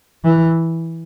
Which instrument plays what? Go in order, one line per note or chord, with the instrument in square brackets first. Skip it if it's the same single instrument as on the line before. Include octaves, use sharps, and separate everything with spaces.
[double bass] E3